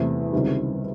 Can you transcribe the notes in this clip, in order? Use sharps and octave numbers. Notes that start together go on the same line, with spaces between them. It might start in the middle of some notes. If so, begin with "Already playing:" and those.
Already playing: E2 C3 E3 A3
C#2 C3 D#3 G3